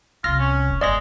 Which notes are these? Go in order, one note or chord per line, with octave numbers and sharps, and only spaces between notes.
C2 C3 F4 F6 A#6
C#4
E1
G1 E2 G#3 D5 D#5 A#6